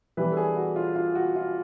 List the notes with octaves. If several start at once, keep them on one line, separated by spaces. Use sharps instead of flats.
E3 G3 B3 D4 B4
A4
G#4
F#4
F4
F4
F#4
F4